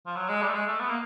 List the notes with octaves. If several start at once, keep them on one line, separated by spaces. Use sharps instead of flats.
F3
F#3
G#3
G3
A3
G#3
A3
B3
A#3